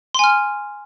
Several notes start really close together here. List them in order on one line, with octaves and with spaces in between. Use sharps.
C6 G#5 F6